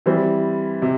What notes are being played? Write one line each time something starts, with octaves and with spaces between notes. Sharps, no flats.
E3 G3 C4
C3